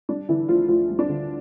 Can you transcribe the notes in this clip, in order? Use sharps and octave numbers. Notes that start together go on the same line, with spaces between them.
G3 D4
D3 E3 E4
D2 F3 F4
D2 F3 F4
G3
D4
D3